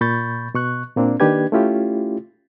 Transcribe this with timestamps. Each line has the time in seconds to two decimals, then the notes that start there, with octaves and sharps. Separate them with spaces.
0.01 A#2 B5 C#6 G6 A6
0.55 B2 C#6 F#6
0.96 A#2 A#3 C4 D4
1.20 D#3 A#3 D4 G4 B4 G#6
1.52 A3 C#4 E4 F4 G4